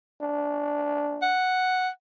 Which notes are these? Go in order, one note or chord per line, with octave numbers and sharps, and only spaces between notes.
D4
F#5